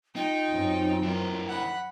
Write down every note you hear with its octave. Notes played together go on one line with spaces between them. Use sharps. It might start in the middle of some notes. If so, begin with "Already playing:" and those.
D#4 F4 G5
F#2 C4 C#4
E3 A#4
F#5 B5